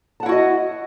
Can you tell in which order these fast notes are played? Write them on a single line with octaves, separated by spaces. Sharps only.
A5 F#5 E4 F#4 D#5